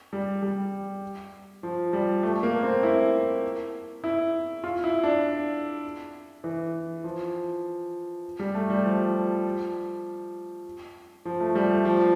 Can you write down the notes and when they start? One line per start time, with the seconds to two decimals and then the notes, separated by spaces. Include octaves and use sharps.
0.13 G3
0.43 G3
1.63 F3
1.93 G3
2.23 A3
2.43 A#3
2.63 C4
2.83 E4
4.04 E4
4.64 F4
4.84 E4
5.03 D4
6.44 E3
7.04 F3
8.39 G3
8.54 A3
8.70 G3
8.85 F3
11.25 F3
11.40 A3
11.55 G3
11.70 A3
11.85 F3